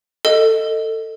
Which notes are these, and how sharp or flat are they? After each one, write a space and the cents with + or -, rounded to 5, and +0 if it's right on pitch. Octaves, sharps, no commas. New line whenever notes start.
A4 +20 D#5 +0